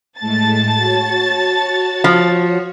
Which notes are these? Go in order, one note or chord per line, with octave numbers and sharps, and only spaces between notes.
A2 G#3 A3 A5 A6
F#4 C#5
F3